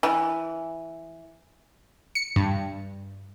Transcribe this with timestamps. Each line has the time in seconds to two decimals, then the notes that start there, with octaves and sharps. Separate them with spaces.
0.03 E3 G#5
2.15 C#7
2.36 G2